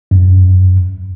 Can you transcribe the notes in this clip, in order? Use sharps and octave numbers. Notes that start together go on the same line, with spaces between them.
F#2